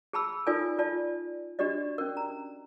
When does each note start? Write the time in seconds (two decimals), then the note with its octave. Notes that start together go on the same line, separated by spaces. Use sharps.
0.13 G#4 A5 B5 E6
0.47 D#4 F4 A4 A#4 D5 G#5
0.79 F4 D5 A5
1.59 D4 F#4 G4 D5 D#5
1.98 C#4 A#4
2.17 A#5